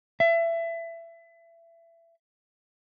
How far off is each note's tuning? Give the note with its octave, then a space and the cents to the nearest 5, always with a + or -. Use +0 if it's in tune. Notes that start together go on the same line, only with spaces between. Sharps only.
E5 +25